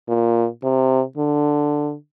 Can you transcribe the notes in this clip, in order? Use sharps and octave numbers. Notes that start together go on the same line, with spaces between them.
A#2
C3
D3